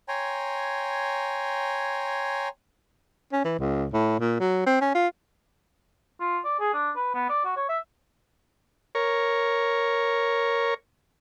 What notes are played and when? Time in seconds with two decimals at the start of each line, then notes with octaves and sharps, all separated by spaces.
0.08 C#5 G5 G#5 A#5 C6
3.32 C#4
3.45 E3
3.59 C#2
3.93 A2
4.20 A#2
4.40 F#3
4.66 C4
4.81 C#4
4.95 F4
6.20 F4
6.45 D5
6.60 G#4
6.74 D4
6.96 B4
7.14 B3
7.29 D5
7.45 F#4
7.57 C#5
7.69 E5
8.95 A#4 C#5